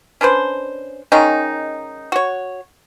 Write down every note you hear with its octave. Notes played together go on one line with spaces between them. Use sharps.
C#4 D4 B4 C5
D#3 G#3 C#4 D#4
F#4 C#5